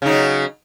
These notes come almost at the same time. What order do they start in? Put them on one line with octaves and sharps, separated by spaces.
C#3 D#4 F#3